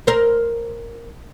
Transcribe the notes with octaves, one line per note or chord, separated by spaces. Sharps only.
A#4 C5